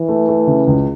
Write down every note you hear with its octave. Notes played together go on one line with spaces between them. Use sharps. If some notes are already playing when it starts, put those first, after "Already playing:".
Already playing: E3
A3
A3
C#3
C#2